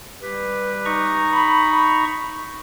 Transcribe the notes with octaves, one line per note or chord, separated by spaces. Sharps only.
G3 G4 B4
D#4 A#5 C#6
B5